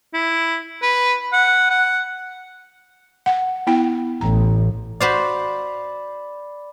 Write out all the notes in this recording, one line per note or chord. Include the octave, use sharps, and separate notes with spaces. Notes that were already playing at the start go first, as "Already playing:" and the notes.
E4
B4
F#5
F#5
F#5
B3 E4 G5
A1 A#5
F#4 C5 D5 F5 B5